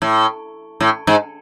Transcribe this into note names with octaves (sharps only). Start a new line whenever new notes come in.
A2
A2
G#2